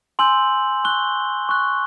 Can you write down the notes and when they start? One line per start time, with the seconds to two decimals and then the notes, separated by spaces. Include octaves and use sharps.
0.19 G#5 C6 E6 G6 F#7
0.84 C#6 F#6 G7
1.49 C#6 F#6